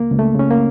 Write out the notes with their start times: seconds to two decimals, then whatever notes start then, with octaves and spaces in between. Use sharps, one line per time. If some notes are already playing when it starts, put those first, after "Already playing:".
Already playing: C#2 A#3
0.11 C#2
0.19 A3
0.35 C#3 C#4
0.50 A#3